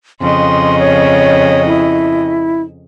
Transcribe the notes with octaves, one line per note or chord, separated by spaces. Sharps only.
F2 C#3 D#5 C6
C#5
E4